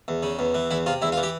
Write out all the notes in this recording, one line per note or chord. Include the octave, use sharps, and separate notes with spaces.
E2
C#3
E2
E3
E2 E4
C3 F4
E2 E4
F4
E3
G4